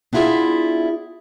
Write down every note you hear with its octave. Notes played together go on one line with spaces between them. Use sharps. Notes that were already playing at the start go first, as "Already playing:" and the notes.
B3 D4 E4 F4 G#4 E5